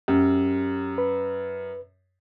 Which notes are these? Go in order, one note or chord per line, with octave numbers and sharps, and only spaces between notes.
F#2 G4
B4